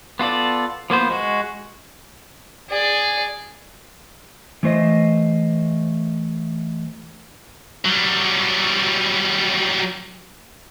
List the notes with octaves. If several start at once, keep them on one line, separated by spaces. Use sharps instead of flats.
B3 F4 A4 D5
F3 A#3 B3 C5
G#3 F#4
G#4 D5
E3 A3 C5 D#5
F#3 G3